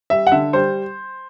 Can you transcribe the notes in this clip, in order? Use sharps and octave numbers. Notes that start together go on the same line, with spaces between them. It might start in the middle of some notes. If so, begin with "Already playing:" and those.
G3 E5
F#5
D3 E5
G3 C5